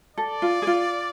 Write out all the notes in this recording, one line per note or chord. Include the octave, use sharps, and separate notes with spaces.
A4 D5
F4
G#4
F4